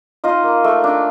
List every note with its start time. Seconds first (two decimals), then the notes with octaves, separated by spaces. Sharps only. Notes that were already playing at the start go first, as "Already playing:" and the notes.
0.24 D#4 F4 D#5
0.44 A#3
0.64 A3
0.84 D4